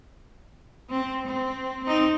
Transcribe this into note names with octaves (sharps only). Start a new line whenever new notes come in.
C4
C4
C4 D#4